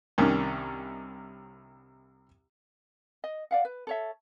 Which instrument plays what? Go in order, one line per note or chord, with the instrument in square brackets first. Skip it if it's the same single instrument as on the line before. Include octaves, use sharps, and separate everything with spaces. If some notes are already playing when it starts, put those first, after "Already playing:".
[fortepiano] C2 D#3 C#4 D4
[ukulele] D#5
D5 F5 F#5
B4
A4 C#5 E5